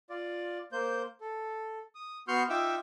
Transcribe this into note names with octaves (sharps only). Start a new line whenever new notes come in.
F4 D5
A#3 C5 G6
A4
D#6
B3 F#4 C6 C#6 F6 G6
D#4 F4 E5 G5 D6 E6